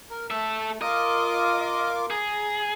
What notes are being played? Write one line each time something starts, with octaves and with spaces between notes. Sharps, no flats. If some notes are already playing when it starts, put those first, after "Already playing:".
A#4
A3 A4 E5
F4 A#4 D#5 D6
G#4 A#5